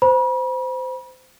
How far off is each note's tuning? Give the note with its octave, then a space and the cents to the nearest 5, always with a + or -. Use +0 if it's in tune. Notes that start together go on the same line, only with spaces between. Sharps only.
C5 -20 B5 -40